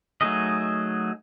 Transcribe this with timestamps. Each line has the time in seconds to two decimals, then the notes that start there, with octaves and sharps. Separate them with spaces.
0.21 F#3 A3 D#4 G#4 D#5